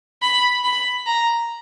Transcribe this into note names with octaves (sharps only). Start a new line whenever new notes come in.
B5
B5
A#5